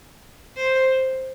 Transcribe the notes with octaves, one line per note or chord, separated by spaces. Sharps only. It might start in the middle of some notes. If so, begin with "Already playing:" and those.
C5